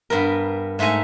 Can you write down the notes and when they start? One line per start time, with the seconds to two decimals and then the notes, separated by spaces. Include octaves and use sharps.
0.10 G2 B3 A#4
0.79 G#2 A3 E5 F5 G#5 A#5